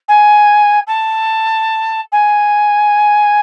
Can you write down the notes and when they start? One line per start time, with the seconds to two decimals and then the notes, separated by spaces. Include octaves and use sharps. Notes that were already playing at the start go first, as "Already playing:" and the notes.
0.08 G#5
0.87 A5
2.12 G#5